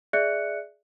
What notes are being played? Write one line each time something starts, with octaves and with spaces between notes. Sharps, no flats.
G#4 D5 E5 F#6 C#7